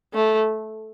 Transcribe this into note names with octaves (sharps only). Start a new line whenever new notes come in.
A3